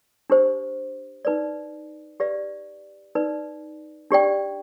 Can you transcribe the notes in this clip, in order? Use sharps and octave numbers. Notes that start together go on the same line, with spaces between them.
D4 G4 C5
D#4 B4 D5
G4 B4 D5 F5
D#4 B4 D5
D4 G4 D5 G5